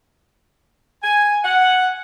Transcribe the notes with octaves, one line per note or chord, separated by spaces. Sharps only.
G#5
F#5